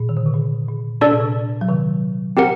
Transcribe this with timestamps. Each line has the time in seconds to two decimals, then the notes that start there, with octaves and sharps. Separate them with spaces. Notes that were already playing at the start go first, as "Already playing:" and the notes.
Already playing: A#2
0.09 D#3
0.17 D3
0.26 C3
0.34 A#2
0.68 A#2
1.01 C3 D4 A4 D5 A5
1.11 A#2
1.20 C3
1.61 F#3
1.68 C3 D#3
2.37 C4 G4 A#4 F#5